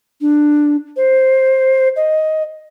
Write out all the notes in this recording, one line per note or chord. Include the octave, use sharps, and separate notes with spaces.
D4
C5
D#5